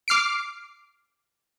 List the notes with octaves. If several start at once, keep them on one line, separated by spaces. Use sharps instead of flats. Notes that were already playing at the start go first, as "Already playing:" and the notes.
D6 F6 C7 D7